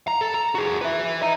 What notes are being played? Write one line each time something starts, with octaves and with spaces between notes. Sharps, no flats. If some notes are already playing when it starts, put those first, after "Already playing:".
A#5
A4
A#5
F#4 G#4
B4 E5
D#5 A#5